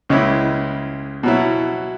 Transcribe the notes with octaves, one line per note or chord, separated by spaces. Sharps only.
C#2 C#3 G#3 E4
B2 F#3 E4